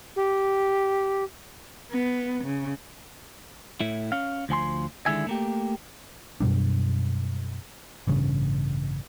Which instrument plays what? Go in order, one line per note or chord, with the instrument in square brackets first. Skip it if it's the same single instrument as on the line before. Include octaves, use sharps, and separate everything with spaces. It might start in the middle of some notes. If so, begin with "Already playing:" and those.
[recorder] G4
[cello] B3
C#3
[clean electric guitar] A2 E4
C#4 F5
D2 F3 G#5 C6
D3 D#3 G#3 E4 E5 G#5
A3 A#3 G4
[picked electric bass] F#2 B2 G3 D4
A1 G2 C#3